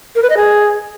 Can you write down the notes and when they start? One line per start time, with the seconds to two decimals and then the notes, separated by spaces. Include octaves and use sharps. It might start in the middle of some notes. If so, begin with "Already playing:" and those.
0.15 A#4
0.22 B4
0.30 D#5
0.37 G#4